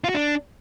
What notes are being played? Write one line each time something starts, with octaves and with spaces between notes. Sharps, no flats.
F4
F#4
D4